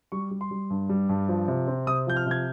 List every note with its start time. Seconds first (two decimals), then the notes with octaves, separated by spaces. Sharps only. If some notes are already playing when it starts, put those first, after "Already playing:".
0.12 G3 C#6
0.31 G3
0.41 C6
0.51 G3
0.70 G2
0.89 G3
1.09 G2
1.29 F3
1.48 C3
1.68 C4
1.87 C3 D#6
2.07 F3 G6
2.16 F6
2.26 C3 G#6